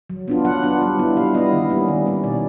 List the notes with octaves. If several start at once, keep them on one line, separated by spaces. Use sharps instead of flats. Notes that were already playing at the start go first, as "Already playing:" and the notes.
F#3
B3 D4 F4
F#3 F#5
B3 D4 F4
G3
B3 E4
G3 F5
B3 E4 D#5
D#3
G3 A#3 C#4
D#3
G3 A#3 C#4
B2 D5